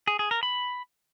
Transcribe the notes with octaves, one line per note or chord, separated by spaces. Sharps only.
G#4
G#4
A#4
B5